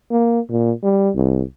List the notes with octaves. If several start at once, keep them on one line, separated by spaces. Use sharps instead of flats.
A#3
A#2
G3
C2